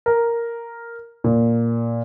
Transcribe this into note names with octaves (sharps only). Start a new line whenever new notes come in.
A#4
A#2